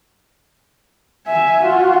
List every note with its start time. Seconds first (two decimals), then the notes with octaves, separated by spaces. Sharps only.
1.28 E5 G#5
1.63 F4 F#4